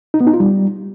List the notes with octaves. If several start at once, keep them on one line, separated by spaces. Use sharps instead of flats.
D#4
B3
D#4
F4
G3